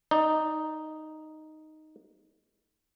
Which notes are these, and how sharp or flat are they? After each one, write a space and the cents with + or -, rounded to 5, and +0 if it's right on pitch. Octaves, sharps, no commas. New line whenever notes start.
D#4 +0 D5 +25